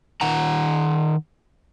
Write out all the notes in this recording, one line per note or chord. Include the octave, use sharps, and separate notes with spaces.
D#3 D#4 F#5 A#5